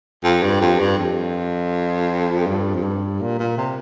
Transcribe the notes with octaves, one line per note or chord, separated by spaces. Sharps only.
F2
G2
F2
G2
F2
G2
F2
G2
A#2
A#2
C3